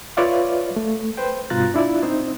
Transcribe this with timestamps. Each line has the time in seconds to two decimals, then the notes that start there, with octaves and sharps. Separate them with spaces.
0.17 F4 B4 C#5 D5 E5 F5
0.76 A3
1.17 B4 C5 G5
1.50 G2 B2 F4 A#5 F#6 A6
1.74 D4 E4 F4 D5
2.03 C4 D#4 C5